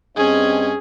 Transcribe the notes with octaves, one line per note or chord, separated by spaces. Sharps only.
G2 C4 C#4 G#4 D#5